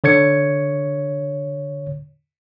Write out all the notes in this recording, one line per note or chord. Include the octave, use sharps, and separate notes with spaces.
D3 C#5 G#6 C#7